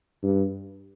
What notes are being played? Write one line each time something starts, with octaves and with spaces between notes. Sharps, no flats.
G2